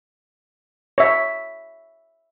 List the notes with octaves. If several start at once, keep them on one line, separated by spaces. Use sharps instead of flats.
C#5 E5